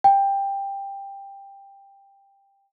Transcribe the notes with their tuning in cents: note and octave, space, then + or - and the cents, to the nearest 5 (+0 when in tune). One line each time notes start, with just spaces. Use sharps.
G5 +15